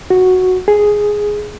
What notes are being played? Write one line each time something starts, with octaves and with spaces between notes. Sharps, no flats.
F#4
G#4